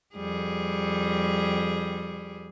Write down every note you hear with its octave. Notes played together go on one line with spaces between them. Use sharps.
F2 G3 G#4